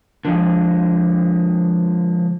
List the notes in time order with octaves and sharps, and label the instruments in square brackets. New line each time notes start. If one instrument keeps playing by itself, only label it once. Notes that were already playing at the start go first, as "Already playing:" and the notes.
[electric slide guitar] D3 F3 G#3